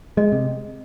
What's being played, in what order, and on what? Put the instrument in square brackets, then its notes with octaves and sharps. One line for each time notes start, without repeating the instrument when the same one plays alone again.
[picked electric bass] G#3 [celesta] D#5
[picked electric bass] C3